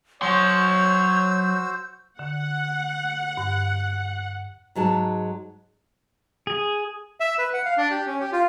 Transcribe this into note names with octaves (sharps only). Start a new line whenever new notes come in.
F#3 F#4 C5 C#5 C6 E6 G6
D3 F#5
G2
G#2 F#3 G#3 A5
G#4
E5
B4
F#5
F5
D4
G4
C#4
G4
F4